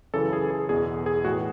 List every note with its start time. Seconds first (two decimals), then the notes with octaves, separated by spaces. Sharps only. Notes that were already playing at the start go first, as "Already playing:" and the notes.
0.14 F#2 C#3 E3 A4
0.33 G#4
0.51 G#4
0.69 E2 B2 G#4
1.06 G#4
1.24 A2 E3 F#4